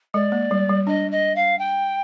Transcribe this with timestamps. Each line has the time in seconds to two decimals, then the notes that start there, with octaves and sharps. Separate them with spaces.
0.14 G#3 D5
0.32 A#3
0.51 G3
0.69 G3
0.87 D4 D#5
1.11 D#5
1.36 F5
1.59 G5